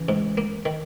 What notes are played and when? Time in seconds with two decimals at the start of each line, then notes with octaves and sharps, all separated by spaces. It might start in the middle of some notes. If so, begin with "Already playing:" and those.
Already playing: C#3 E3
0.09 G#2
0.37 A#3
0.65 D#3